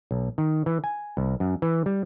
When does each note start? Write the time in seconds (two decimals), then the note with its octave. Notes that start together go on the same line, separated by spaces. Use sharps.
0.11 B1
0.38 D#3
0.66 E3
0.84 G#5
1.17 C2
1.40 F#2
1.62 E3
1.86 G3